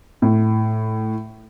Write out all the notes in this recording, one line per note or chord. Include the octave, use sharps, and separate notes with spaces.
A2